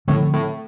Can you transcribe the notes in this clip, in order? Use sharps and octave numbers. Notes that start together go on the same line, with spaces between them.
A2 D3 F3 A3 C4
A2